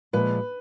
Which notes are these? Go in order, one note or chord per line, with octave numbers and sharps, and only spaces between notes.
A#2 F3 G#3 B4